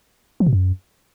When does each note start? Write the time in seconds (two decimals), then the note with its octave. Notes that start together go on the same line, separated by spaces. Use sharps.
0.40 F3
0.47 B2
0.53 F#2